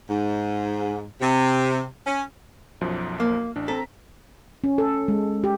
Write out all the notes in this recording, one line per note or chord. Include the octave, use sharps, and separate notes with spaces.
G#2
C3
C#4
B1 F#2 F3
A#3
A1 D4
C4 A4 A#5 B6
C#4
A4
G#3
G4